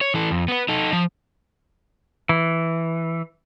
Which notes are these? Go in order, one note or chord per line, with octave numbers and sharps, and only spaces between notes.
C#5
E3 A4
F2
B3 B4
D#4 A4
F3 A5
E3